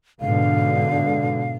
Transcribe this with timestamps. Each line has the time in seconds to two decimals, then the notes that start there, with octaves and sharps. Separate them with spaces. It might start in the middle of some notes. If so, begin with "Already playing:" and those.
0.21 G#2 B2 D3 F5